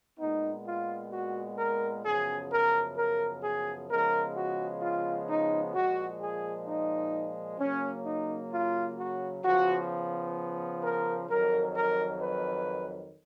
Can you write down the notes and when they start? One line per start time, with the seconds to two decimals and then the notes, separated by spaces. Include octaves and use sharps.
0.19 A#2 G#3 B3 D#4
0.66 F4
1.12 F#4
1.58 A#4
2.05 F#2 C#3 F3 B3 G#4
2.51 A#4
2.97 A#4
3.43 G#4
3.89 C#3 F3 G#3 B3 A#4
4.36 F#4
4.82 F4
5.28 D#4
5.74 A#2 F3 G#3 F#4
6.21 G#4
6.67 D#4
7.59 C#3 F#3 A#3 C#4
8.06 D#4
8.52 F4
8.99 F#4
9.44 C#3 F3 B3 F#4
10.83 A#4
11.30 F2 D#3 F#3 A#4
11.76 A#4
12.22 B4